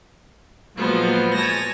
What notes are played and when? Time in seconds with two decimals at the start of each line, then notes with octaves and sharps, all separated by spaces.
0.76 A#2 F3 F#3 G#3 B3
1.35 C#5 G#5 A5 A#6